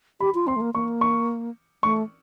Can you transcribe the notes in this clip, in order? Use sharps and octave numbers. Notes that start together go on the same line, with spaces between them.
G4 B5
F4
C4 C6
A3
A#3
A#3 C#6
C#6
A3 C#6